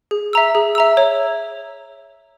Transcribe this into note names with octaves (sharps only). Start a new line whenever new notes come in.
G#4
E5 A#5 E6
G#4
E5 A#5 E6
C#5